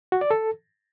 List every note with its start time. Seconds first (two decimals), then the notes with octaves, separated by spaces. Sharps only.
0.12 F#4
0.21 D5
0.31 A4